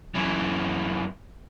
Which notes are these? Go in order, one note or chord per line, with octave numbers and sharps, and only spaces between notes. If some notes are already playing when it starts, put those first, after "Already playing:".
F#2 E3